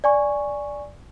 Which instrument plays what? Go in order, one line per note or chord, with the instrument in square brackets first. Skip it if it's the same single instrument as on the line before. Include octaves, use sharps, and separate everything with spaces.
[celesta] D5 G#5 C#6